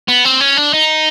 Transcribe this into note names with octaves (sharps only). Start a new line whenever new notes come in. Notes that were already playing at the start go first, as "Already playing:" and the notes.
B3
C4
C#4
D4
D#4